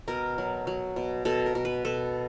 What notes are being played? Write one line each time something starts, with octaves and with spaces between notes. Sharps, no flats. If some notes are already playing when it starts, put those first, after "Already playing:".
B2 A#4
F#3
F#3
B2
B2 A4
A#4
B2
B4
B2 A4